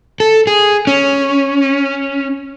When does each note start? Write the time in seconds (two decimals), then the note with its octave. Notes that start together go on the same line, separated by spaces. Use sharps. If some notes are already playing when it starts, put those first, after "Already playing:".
0.20 A4
0.47 G#4
0.87 C#4